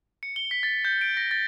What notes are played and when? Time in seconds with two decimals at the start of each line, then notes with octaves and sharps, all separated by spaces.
0.23 C#7
0.36 G7
0.51 B6
0.63 A6
0.85 G6
1.01 D7
1.17 A#6
1.31 A6